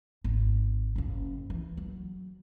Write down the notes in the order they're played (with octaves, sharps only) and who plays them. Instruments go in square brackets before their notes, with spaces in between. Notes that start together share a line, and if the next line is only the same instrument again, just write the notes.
[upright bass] G#1
F#1 C#3
E3
F#3